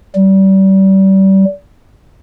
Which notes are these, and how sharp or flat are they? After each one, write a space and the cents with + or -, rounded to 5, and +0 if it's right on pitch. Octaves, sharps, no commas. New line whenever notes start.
G3 -30